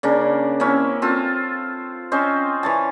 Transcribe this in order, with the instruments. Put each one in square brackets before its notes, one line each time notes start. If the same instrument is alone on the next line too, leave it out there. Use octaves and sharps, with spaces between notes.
[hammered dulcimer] C#3 A#3 D4
A#3 C4 C#4 E4
C4 F4 A4
C4 C#4 C5 D#5
E3 C#5 A5